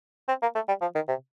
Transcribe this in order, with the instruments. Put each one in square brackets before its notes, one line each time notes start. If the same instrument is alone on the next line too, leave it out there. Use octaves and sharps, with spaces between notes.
[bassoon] C4
A#3
A3
G3
F3
D#3
C3